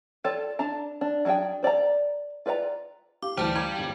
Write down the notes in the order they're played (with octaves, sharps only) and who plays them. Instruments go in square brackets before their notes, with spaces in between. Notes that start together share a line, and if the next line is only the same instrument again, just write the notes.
[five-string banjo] F4 A4 C#5 D5 G5
D4 A5 A#5
D4
F#3 G#3 D4 G#4 G5
C5 D5 G#5 A#5
F4 B4 D5 F#5 A#5
[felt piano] G4 [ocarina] F5 [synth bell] D6
[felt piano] D2 E3 [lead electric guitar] G3 G4 [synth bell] C5 A5
[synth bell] A#5 [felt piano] D6 G#6
[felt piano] G1